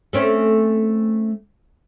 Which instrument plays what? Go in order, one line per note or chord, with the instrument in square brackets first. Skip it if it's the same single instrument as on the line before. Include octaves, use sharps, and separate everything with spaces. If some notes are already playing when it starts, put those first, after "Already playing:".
[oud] A3 C4 C#4